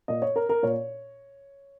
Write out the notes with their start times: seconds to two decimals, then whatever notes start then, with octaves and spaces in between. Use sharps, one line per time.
0.08 A#2 D#5
0.22 C#5
0.36 A#4
0.49 A#4
0.63 A#2 C#5